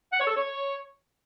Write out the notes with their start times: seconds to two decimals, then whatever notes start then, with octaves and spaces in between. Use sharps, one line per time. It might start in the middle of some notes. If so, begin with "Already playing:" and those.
0.13 F#5
0.20 C#5
0.27 A4
0.35 C#5